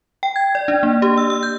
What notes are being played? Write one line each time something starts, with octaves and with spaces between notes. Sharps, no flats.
G5
G#6
D5
D4
A#3
G4
E6
E6
G6